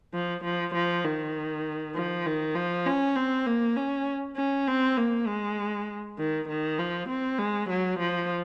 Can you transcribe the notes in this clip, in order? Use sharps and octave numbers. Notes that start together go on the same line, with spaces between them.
F3
F3
F3
D#3
F3
D#3
F3
C#4
C4
A#3
C#4
C#4
C4
A#3
G#3
D#3
D#3
F3
C4
G#3
F#3
F3